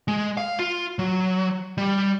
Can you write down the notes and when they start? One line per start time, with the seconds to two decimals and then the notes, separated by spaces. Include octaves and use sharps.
0.08 G#3
0.37 F5
0.59 F4
0.99 F#3
1.78 G3